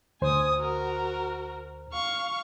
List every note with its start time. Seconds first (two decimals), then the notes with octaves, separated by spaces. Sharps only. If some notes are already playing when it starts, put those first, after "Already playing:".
0.22 D2 C5 G#5 D#6
0.57 F#4 A#4
1.93 F5 C#6